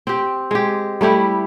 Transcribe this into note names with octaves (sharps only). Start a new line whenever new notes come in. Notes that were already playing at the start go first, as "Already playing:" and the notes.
C4 G4
G#3 G4
G3 A3 E4 G4